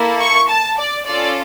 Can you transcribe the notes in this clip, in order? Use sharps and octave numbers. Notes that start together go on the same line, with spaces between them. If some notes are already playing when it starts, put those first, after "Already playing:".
Already playing: A#3 E4 A4
C#6
A5
D5
C#4 F4 A4 D5